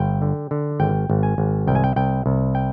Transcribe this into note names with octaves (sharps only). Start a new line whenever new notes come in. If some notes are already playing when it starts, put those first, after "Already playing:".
Already playing: G1 G5
D3
D3
G#1 G5
G#1
G#5
G#1
C2 G5
G#5
G5
C2 G5
C2
G5